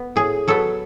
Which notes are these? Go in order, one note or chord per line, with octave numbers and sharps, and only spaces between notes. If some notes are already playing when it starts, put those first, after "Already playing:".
Already playing: B3
A2 G#4
F#3 B3 A4